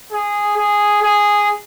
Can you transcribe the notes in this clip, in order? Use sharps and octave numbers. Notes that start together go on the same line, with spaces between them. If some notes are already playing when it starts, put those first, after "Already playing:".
G#4
G#4
G#4